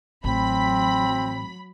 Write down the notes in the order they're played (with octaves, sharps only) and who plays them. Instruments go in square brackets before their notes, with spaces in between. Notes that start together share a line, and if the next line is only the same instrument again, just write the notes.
[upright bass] A1 [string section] F#3 B5 [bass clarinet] C4